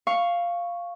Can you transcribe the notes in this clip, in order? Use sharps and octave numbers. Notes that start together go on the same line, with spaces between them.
F5 C#6